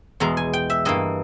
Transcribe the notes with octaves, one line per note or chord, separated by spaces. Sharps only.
E2 B2 G#3 A#5
G#5
G5
E5
G2 E3 A#3 D#5